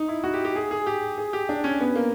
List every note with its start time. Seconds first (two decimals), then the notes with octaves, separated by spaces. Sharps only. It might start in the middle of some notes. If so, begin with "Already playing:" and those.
Already playing: D#4
0.08 E4
0.24 F#4
0.34 G4
0.45 G4
0.55 G#4
0.71 G#4
0.87 G4
1.18 G#4
1.33 G4
1.49 D4
1.64 C#4
1.80 B3
1.95 A#3